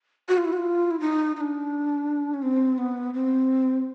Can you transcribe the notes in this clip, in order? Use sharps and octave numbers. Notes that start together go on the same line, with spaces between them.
F#4
F4
E4
F#4
F4
E4
D#4
D#4
D4
C#4
C4
B3
C4